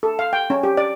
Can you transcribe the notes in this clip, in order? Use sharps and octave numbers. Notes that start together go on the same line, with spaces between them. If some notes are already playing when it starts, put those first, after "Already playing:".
A4
F5
G5
C#4
G4
D5